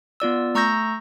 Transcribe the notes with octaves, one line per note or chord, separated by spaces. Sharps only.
B3 F4 D5 E6
A3 A#5 C#6 E6 G6 A#6